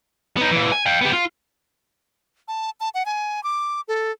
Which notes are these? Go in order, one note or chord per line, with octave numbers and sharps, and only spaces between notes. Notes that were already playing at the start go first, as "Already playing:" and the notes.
B3 D#4
A#2 E3
G#5
F5 G5
B3 G4
F4
A5
A5
F#5
G#5
D6
A4